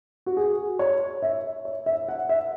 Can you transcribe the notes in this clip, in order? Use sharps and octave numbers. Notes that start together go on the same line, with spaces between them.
F#4
G#4
C#5
E5
C#5
E5
F#5
E5